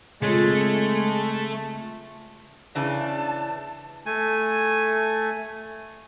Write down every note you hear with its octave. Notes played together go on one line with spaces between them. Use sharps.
C#3 G#3 A3 C4 F4
C#3 E3 D4 A5
A3 G#5